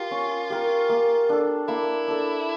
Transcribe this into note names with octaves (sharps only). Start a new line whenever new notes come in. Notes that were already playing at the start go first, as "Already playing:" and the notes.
Already playing: F4 G4 A#4
C#4
G4 A#4
A#3
D4 A4
A#3 E4
D4 A4